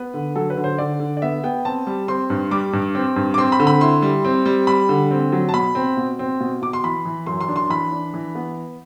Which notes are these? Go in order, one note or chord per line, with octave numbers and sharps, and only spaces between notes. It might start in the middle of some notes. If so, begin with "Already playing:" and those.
Already playing: B3 B4
D3
F#3 A4
B4
D3
C5
D3 D5
D3
D5
B3 E5
B3 G5
C4 A5
G3
C4 C6
G2
G3 D6
G2
C4
G2
D6
C4 C6
B5
D3
B5
E4 C6
G3
C4
G3
G3 B5
D3
C4
F#3
A5
B2 B5
C4
B2
C4
B2
B2 D6
C6
E3 B5
E3
F#2 C6
C6
D4
C6
E3 B5
D4
E3
B3